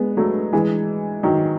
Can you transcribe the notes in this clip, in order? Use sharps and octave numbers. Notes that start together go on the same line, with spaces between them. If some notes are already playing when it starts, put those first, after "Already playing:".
Already playing: G#3 B3
F#3 A3
E3 G#3
D#3 F#3